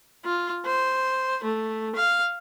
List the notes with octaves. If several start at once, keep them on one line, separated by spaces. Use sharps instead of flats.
F4
C5
A3
F5